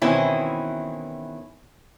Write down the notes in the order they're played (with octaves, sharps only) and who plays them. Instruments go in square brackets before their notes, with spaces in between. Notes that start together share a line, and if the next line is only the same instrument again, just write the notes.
[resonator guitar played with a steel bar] B2 D#3 E3 C4 C#4 E4